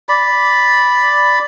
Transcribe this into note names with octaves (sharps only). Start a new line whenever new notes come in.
D5 B5